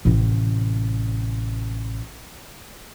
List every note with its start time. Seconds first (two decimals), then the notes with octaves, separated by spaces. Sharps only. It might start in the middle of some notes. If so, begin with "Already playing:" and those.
0.05 A1 C3